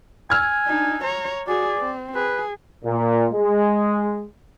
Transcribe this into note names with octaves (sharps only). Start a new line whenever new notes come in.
G#5 E6 F6 G#6
D4 D#4
C#5 A#5
F#4 G#4 D5
C4
G#4 B4
A#2
G#3